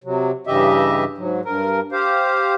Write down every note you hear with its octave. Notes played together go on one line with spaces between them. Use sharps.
C3 F#3
G2 C#3 E3 G4 D#5 E5
G#2 F#3
G2 A#4
G4 C5 F5